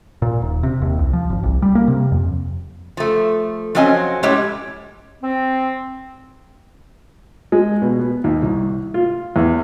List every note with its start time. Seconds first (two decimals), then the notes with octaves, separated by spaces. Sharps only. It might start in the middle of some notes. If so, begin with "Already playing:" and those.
0.22 A#2
0.42 D#1
0.63 C3
0.82 D#2
0.99 C2
1.13 F3
1.30 G#1
1.43 C2
1.62 G3
1.75 A#3
1.88 C3
2.12 F2
2.97 F3 A3
3.75 F3 F#3 C4 C#4 D#5 G#5
4.23 A2 G#3 C#4 G4 C#5
5.23 C4
7.52 G#3
7.82 B2
7.99 B3
8.24 D#2
8.42 C2
8.94 F4
9.36 E2